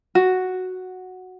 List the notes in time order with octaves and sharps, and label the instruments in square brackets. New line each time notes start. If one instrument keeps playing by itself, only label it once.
[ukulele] F#4